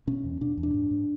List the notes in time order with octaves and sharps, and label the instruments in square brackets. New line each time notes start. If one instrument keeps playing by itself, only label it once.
[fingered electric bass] B2 C#4
E2
B2 D4
E2
D4
G#2
G#2